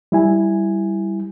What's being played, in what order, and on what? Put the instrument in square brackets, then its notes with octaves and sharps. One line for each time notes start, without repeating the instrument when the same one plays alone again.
[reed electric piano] G3 E4 G#5